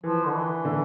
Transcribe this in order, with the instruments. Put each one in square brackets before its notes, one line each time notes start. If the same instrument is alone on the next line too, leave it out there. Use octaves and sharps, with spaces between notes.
[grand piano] E3 [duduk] F3
[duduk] D3
E3
[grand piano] D3